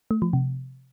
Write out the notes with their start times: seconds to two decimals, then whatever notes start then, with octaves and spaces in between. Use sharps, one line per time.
0.11 A3
0.22 F3
0.33 C3